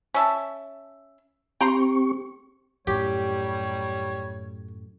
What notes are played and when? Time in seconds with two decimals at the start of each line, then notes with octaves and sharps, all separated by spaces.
0.14 C#4 E5 A5
1.61 C4 G4 G5 A#5 C6 C#6
2.87 F#2 A2 G3 G4 C#5